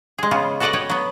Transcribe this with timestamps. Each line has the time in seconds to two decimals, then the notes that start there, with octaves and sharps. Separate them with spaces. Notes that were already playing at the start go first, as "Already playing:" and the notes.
0.18 G#3 G#4
0.31 C#3 B3 F4
0.60 F#4 A4 B4 D5 D#5 F#5
0.73 B4 C#5 D#5 F#5 G5
0.90 F#3 B3